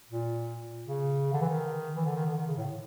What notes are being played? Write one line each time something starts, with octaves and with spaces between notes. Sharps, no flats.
A#2
C#3
D3
E3
D#3
E3
D3
D#3
D3
D#3
C#3
A2